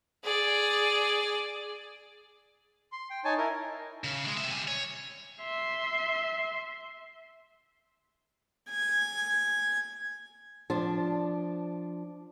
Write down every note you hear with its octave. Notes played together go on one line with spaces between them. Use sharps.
G#4 D5
C6
G5
D#4 C#5 G#5 A5
E4 A#4
C#3
D3 G#3
C3 E5
G3 G#5
C#5
E5 C6
G#5
F3 D4